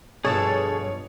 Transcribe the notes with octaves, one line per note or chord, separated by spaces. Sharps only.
G2 B2 F3 G#4 A4 C#5 A5